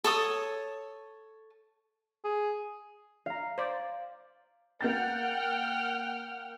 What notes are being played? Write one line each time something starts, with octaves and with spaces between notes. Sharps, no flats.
A4 C#5 D#6
G#4
F5 A#5
C5 D5
A#3 F#5 G5 F6 G6 A6